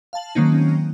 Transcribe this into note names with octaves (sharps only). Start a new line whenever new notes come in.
F5 A5 F#7
D#3 F#3 A#3 C4 C#4 D#4